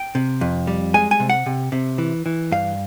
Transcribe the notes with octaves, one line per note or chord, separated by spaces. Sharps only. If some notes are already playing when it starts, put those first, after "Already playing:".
Already playing: G5
C3
F2
G3
G#3 G#5
G#5
C3
F#5
C3
C3
E3
E3
G2 F5